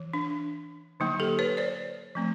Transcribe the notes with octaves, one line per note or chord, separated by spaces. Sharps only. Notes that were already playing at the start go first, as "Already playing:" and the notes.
Already playing: E3
D4
D3 F#3 A#3 D#4
G4 A4
B4 C#5
C5 D5
F3 A3 C4